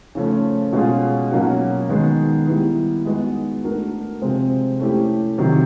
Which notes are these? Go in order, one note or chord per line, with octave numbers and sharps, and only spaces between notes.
C#3 F3 A3 C#4
B2 G#3 C#4 F4 G#4
B2 F#3 A#3 C#4 F#4
D#3 G#3 B3
G3 B3 E4
G#3 B3 D#4 F#4
A3 D4 F#4 A#4
C3 F3 G#3 C4
A3 C#4 E4 G4
C3 D#3 F#3